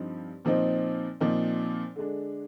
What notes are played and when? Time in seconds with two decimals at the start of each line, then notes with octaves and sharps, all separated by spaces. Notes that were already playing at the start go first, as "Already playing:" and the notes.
Already playing: G2 F3 C4 D#4
0.45 A#2 F3 C4 D#4
1.20 A#2 F3 C4 D#4
1.96 D3 G#3 D4